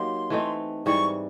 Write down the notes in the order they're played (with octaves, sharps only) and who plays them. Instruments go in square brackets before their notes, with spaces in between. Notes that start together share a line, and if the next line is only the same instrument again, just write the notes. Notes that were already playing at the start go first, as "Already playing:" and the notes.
Already playing: [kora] F#3 A#3 D#4 G4 [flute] C6
[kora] E3 A3 C4 D#4
[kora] G#2 E3 G3 C4 [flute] C#6